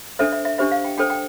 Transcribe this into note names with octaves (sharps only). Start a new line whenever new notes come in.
D4 A4 C5 E5
E5
E5
D4 G4 C5 E5
F5
G5
D4 A4 C5 G5
G5